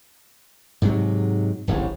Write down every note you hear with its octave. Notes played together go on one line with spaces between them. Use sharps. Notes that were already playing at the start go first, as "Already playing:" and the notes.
G#2 C3 F3 F#3
D1 A1 A2